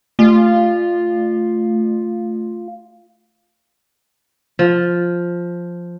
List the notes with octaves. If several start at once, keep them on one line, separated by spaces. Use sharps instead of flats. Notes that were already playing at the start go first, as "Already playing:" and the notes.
A3 F4
F3